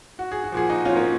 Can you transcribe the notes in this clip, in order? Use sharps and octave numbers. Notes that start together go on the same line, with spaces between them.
F#4
G#4
F#4
A#2 F3 G#4
D#4 F#4
C#4 F4
A#3 C#4